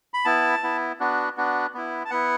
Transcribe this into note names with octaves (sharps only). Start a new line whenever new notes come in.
B5
B3 E4 A5
B3 E4
B3 D4 F#4
B3 D4 F#4
B3 E4
A5
B3 E4 F#5